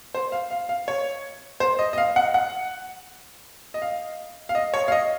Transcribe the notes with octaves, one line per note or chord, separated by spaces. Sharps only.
C5
F5
F5
F5
C#5
C5
D#5
D#5
F5
F#5
F#5
D#5
F5
F5
D#5
C#5
F5
D#5